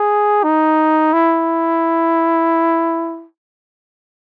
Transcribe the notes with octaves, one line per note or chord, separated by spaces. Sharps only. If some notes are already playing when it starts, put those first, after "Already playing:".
Already playing: G#4
D#4
E4